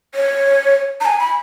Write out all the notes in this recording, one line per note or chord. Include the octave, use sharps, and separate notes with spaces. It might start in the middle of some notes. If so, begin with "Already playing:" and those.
C#5
A#5
G#5
B5